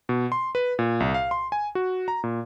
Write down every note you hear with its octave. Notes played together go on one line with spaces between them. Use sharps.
B2
C6
B4
A#2
C2
F5
C6
G#5
F#4
A#5
A#2